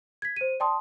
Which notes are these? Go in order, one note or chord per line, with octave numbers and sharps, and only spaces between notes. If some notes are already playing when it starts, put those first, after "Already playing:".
G#6 B6
C5 D#7
D5 G5 A5 C6 D#6